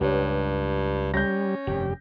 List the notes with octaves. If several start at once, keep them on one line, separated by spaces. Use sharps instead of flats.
C#2 G2 G4 B4 C#5
G3 C#4 G6 A#6
F1 G2 G4